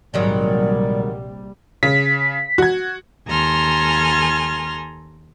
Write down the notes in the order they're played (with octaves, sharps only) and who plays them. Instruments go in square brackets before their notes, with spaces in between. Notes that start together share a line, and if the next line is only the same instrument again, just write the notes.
[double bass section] A#1 C3 G3 [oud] G#2 D#3 F#3 [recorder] D5
[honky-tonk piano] C#3 [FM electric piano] B6
[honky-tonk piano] F#4 G#6
[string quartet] D#2 A4 G#5 A#5 C6 F6